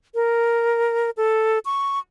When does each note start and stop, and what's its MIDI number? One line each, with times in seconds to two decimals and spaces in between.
0.15 1.10 70
1.17 1.59 69
1.65 1.99 85